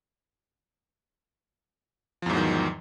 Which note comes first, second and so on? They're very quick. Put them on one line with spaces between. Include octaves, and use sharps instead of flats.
F3 E2 G#2 F#3 D#3